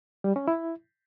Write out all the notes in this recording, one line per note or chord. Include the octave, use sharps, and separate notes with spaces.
G3
C#4
E4